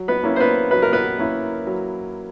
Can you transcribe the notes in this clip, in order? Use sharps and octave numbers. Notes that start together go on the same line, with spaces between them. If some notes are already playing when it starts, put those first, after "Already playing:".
Already playing: F#3
B3 B4
A#3 C#4 E4
C5
B3 B4
F#3 B4
A#4
B3 B4
A#3 C#4 E4
F#3